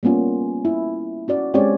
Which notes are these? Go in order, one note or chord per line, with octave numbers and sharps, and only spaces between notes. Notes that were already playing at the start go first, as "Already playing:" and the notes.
G3 A#3 B3 C#4 F4
E4
C#4 F#4 D5
G#3 C4 C#4 G4 C#5 D5